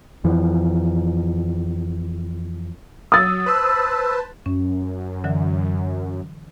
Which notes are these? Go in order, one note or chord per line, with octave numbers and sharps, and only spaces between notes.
F2 E3 F3
F#3 D#6 E6 A6
B4 C5 A5
F#2 C#4
D3 E3 F#3